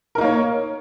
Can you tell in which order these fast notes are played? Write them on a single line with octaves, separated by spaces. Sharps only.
A#4 D#4 A#3 C#5